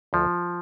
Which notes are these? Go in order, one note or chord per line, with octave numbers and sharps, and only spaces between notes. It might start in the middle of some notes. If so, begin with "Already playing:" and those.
D2 F3